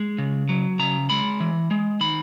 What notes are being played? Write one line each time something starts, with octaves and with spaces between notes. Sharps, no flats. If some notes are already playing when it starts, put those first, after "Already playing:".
Already playing: G#3
C#3
F#3
C#3 A#5
G#3 B5
E3
G#3
D#3 B5